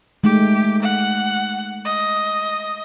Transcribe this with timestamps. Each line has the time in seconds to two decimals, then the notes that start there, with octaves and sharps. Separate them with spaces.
0.24 G#3 A3 D#4 G4
0.82 F#5
1.85 D#5